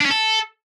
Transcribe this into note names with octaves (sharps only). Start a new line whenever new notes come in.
D4
C#4
A4